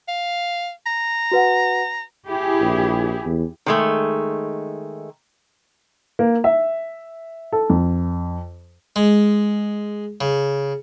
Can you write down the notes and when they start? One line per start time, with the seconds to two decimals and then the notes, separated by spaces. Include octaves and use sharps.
0.08 F5
0.86 A#5
1.32 F#4 B4 F#5
2.29 E4 G4 G#4
2.61 A#1
3.26 E2
3.66 D#3 G#3 A3
6.19 A#3
6.44 E5
7.52 A4
7.70 F2
8.96 G#3
10.21 C#3